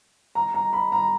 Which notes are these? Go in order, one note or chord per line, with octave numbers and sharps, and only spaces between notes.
A#5
A#5
B5
A#5